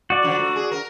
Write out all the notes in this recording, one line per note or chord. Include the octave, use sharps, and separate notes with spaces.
F#4 D5
D3 F3
A3
G#4
A#4